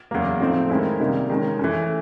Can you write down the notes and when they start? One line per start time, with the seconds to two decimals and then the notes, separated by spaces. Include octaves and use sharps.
0.11 E2 C#3 F#3 A#3
0.40 A2 F3 A3 C4 D#4
0.70 D#3 G#3 C#4 E4
1.00 C3 D#3 G3 A#3 D#4
1.30 D#3 G#3 C#4
1.59 E3 A3 C#4